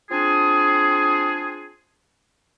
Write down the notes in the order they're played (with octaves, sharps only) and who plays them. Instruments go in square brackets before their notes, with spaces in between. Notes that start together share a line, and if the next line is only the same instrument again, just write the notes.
[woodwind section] C4 D4 F4 G#4